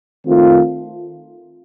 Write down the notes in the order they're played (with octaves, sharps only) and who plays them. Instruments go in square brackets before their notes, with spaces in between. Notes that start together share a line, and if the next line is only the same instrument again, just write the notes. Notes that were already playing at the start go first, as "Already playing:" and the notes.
[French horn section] D#3 A3 C4 F4